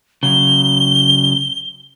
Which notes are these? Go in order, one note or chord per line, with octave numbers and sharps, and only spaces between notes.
C#3 F#3 G7